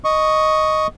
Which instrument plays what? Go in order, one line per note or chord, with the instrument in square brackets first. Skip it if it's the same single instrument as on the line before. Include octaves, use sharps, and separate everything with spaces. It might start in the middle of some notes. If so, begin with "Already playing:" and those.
[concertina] D#5 C#6